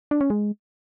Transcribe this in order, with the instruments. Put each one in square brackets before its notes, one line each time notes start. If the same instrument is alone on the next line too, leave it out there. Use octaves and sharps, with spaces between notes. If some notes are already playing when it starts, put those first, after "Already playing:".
[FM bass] D4
C#4
G#3